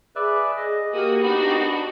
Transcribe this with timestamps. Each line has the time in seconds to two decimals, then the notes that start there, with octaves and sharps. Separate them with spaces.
0.16 G#4 B4 D5 E5
0.57 D#5
0.93 A#3 F#4 G4 D#6
1.22 B3 D4 D#4 F#4